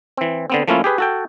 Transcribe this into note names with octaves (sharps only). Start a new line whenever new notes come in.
E3 C4
D3 B3 C4
F3 A3 A#3 C#4 E4 F4
G4 G#4 B4
F#4 A4 G5